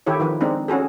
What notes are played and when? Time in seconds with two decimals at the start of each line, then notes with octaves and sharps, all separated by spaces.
0.06 D#3 E4 G4 A4 C#5
0.20 D#3 F3 B4
0.41 G#3 C4 D4 D#4
0.68 C#4 F#4 G#4 A4